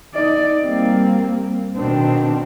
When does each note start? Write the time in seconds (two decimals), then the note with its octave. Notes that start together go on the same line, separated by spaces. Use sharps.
0.14 D#4 D5
0.62 G3 A#3 C4
1.78 B2 D#3 C4 D4